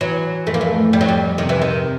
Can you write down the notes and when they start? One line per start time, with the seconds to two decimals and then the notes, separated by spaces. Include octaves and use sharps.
0.01 E3 F#3
0.46 F2 A3
0.54 A#3
0.61 A3
0.93 F2 G3
1.01 F#3
1.08 G3
1.38 C3 D#3
1.49 E3
1.62 D#3